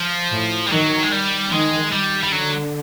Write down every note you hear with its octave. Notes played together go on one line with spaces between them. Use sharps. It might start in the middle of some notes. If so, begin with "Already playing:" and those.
Already playing: F3
A2
G3
D#3 F#3
G#3
G3
D#3 G#3
G3
G3
D3 F#3